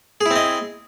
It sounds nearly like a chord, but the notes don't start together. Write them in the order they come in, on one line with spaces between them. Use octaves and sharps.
G#4 E4 C4 D#5